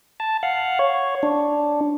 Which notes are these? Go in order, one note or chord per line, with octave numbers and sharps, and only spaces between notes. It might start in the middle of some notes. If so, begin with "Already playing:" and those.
A5
F5 F#5
C#5
D4